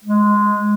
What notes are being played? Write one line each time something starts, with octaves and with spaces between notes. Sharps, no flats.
G#3